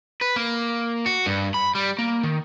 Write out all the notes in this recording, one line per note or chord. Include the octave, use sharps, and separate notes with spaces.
B4
A#3
F#4
G2
B5
G3
A#3
D#3